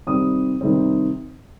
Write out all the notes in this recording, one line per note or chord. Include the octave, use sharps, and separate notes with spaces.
C3 D#3 G3 C4 D#6
C3 D#3 G3 C4